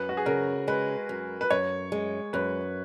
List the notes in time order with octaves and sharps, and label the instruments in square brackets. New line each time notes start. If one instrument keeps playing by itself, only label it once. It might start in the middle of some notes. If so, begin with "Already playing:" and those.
Already playing: [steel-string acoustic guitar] F#2 [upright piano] B4
[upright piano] F#4
G#4
[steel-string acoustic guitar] C#3 [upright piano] A#4
[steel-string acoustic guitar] G#3 [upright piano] B4
[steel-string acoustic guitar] F#2
[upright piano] B4
[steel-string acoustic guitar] F#2 [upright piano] C#5
[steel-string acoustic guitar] G#3
[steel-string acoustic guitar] F#2 [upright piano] B4